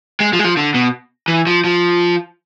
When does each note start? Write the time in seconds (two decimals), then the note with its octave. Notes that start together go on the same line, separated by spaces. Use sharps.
0.20 G#3
0.33 F3
0.39 G#3
0.45 F3
0.57 D3
0.74 B2
1.28 E3
1.47 F3
1.64 F3